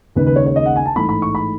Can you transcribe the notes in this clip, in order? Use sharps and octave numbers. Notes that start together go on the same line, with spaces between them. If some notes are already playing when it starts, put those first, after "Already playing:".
D#2 C#3 G#3 B4
B4
C#5
C#5
D#5
F#5
G#5
A5
A1 G#2 E3 A3 D#4 B5
B5
C#6
B5